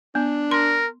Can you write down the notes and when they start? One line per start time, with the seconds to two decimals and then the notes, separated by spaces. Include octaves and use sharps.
0.15 B3 D4
0.51 A#4 C6